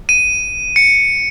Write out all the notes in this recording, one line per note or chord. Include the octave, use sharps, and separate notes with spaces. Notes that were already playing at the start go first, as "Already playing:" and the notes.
D#7
C#7